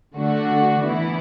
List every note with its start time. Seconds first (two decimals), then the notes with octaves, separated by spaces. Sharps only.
0.16 D3 A3 D4 F#4
0.81 E3 B3 E4